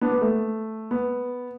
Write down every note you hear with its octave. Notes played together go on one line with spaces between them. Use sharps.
B3 D4
B3
A3
B3